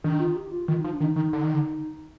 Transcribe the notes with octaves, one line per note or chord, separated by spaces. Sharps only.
D#3 D4
F4
G4
F4
D#3 F4
F3 D#4
D4
D#3
D#4
D#3
D3
D#3
D3